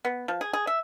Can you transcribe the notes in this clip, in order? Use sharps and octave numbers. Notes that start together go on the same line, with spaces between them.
B3
F3
G#4
G#4
E5